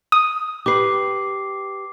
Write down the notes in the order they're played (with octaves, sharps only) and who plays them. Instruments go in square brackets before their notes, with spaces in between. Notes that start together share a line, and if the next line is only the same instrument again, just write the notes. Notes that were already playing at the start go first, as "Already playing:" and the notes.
[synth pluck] D#6
[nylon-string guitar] G4 B4 [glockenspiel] D6 C7